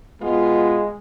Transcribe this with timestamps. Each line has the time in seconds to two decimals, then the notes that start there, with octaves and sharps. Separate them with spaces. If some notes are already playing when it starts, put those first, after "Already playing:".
0.22 B2 G#3 B3 F4